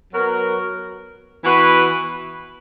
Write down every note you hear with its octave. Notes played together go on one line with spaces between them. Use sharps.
F#3 B3 F#4 A#4
E3 B3 F#4 B4